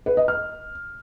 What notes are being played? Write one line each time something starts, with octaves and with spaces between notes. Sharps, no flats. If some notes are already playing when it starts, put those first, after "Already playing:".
B4
D#5
F6